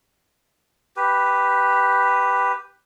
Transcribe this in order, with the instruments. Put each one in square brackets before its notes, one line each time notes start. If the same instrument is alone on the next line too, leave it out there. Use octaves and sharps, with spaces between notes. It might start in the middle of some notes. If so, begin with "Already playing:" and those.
[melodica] G4 B4